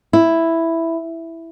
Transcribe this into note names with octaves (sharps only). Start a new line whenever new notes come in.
E4